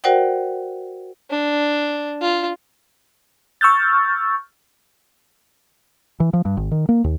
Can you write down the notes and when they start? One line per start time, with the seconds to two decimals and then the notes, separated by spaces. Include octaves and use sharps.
0.04 F#4 A#4 C5 D5 F#5 G5
1.30 D4
2.22 F4
3.61 C#6 E6 F6 G6 A6
6.20 E3
6.33 F3
6.45 G2
6.57 G#1
6.71 D#3
6.89 A#3
7.04 D#2